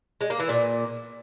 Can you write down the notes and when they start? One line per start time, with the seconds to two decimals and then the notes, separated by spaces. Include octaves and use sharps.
0.21 G#3
0.30 A#3
0.40 E3
0.49 A#2